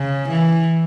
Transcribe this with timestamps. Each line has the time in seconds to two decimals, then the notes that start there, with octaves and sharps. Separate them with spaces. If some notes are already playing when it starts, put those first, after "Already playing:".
Already playing: C#3
0.29 E3